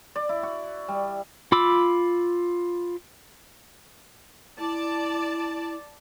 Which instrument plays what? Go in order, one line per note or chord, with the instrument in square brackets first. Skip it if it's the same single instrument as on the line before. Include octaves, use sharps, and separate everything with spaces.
[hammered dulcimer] D5
E4
F#4
G3
[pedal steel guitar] F4 B5 D6 E6
[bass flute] E4 [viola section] D5 A5